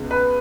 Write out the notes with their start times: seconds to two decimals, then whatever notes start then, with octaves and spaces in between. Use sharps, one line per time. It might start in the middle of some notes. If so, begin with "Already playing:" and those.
Already playing: C#2 C#3 B3
0.11 B4